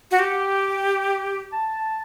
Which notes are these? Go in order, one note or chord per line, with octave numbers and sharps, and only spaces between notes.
F#4
G4 F#5
G5
G5
A5